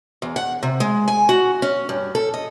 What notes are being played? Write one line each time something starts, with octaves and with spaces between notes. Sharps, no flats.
E2
F#5
C3
G#3
G#5
F#4
C#4
G2
A4
D#5